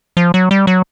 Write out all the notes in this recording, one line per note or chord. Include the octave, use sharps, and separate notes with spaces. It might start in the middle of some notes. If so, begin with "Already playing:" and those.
F3
F#3
G3
F#3